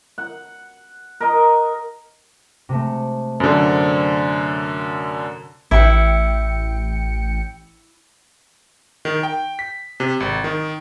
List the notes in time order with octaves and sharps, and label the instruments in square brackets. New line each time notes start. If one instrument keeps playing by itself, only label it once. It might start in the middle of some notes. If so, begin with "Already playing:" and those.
[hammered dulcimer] F#5
A#4 D#5
[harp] C3 G#3 A3
[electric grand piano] F#2 D3 [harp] A4 C5
[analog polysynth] A1 G5 C#7 [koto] E4
[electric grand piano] D#3
G5
B6
C3
G#1
D#3